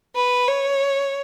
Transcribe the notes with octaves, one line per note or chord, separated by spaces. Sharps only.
B4
C#5